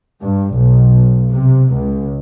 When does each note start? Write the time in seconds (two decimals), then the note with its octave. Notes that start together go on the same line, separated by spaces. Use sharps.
0.22 G2
0.55 B1
1.32 C3
1.74 C#2